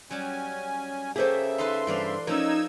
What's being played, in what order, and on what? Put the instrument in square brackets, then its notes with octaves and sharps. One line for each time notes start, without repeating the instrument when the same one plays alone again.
[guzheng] F#3 G3 [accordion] C#4 G#5
[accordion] C#3 E5 [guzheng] A3 A#3 G4 [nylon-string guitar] G#4 C5
[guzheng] D#4 A4 B4 [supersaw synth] C6
[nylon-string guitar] G2 C4 [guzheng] E3 D5 F5
[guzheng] F3 A4 [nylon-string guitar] C#4 A#4 [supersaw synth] D#4 E6 G#6